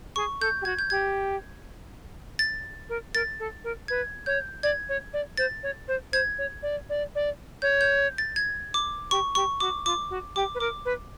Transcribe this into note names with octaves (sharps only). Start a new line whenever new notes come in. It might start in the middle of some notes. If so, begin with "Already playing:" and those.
G#4 C#6
A4 G6
G4
F#4 G#6
G6
G4 G#6
A6
A#4
A#4 A6
A4
A#4
B4 G#6
C#5 G6
D5 G#6
C#5
D5
C5 A6
C#5
C5
C5 G#6
C#5
D5
D5
D5
C#5 G6
G6
A6
G#6
D6
G4 C#6
G4 C#6
F#4 D6
F4 D6
F#4
G4 D6
B4
A#4 D6
B4